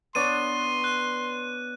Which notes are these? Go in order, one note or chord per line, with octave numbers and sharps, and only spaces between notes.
B3 D4 C#5 C6 D#7
F#6